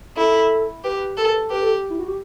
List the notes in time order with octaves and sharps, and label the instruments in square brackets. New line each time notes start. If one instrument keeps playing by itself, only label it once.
[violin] E4 [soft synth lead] A4
[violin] G4 [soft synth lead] B4
[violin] A4
[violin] G4 [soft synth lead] B4
[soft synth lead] A4
E4
F#4
G4